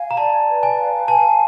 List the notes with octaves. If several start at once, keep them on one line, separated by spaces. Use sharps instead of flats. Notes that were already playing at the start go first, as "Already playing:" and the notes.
Already playing: F5 G#5
A#5
D5 A5
B4
G#5
F5
G#5 A5